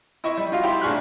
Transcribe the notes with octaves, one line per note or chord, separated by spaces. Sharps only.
E4 D#5 E5 C#6
G3
D#4 F4 F#4 F5
E4 G4 E5 B5 C6
A1 D4 G#4 C#6 F6 F#6